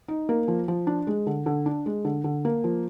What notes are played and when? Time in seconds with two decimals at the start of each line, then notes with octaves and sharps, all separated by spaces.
0.08 D#4
0.29 A#3
0.48 F3
0.68 F3
0.87 D4
1.07 G#3
1.27 D3
1.46 D3
1.66 D4
1.86 G#3
2.05 D3
2.24 D3
2.45 A#3
2.64 F3